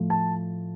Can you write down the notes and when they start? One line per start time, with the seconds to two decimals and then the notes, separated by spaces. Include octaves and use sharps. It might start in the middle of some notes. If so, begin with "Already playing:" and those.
Already playing: A2 F3 A3
0.10 A5